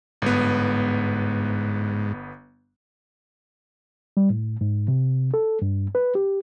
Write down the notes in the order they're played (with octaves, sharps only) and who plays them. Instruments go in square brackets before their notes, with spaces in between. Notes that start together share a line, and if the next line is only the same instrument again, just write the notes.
[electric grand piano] G1 B3 [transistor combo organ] G#2
[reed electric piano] G3
A2
G#2
C3
A4
G2
B4
G4